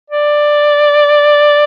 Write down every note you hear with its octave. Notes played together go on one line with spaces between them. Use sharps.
D5